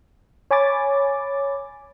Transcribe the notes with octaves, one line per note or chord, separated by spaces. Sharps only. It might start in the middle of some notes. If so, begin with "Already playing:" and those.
C#5 G#5 B5 D6 A6